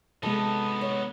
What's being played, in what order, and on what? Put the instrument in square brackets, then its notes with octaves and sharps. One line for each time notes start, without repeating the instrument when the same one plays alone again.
[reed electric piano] C3 G#3 [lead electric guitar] B3 D#4 [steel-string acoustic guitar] A4
[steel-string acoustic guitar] C#5